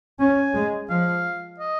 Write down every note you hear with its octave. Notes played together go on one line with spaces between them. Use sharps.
C#4 G#5
G#3
F3 F5
D#5